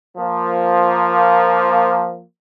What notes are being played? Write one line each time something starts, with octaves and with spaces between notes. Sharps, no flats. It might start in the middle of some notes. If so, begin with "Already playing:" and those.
F3 A#3